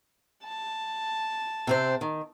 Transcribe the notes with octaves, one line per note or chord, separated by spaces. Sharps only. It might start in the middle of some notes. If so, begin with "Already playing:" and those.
A5
C3 C4 C5
D#3